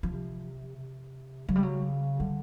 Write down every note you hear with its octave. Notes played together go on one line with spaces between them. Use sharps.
C3 F3
C3
C#3 F#3
G3
F#3
D3 G3